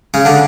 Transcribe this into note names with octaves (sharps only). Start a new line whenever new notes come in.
C#3 C#4
D3 D4